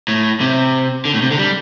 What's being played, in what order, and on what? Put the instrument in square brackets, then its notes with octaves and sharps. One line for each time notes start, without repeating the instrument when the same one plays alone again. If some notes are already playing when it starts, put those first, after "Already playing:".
[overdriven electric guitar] A2
C3
D3
A2
C3
D3
G3